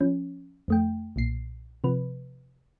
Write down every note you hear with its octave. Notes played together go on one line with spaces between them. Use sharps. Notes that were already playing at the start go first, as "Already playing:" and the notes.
F3 C#4
F2 A3 G5
B1 A#2 C7
C3 F3 B4